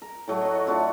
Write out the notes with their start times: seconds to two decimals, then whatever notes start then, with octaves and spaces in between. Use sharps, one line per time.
0.02 A#4
0.28 A2 F#3 A3
0.41 F#4 D#5
0.67 A3 D4 F4 F#4